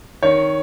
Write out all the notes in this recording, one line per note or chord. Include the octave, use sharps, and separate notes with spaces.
D#3 C#5